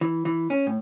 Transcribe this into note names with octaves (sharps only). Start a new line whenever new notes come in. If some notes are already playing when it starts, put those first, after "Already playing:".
E3
E3
C#4
A2